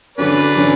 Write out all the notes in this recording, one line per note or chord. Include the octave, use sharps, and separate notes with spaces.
D3 F#3 C#4 B4 D5
D3 F#3 C#4